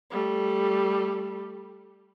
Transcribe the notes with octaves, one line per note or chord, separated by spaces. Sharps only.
G3 A3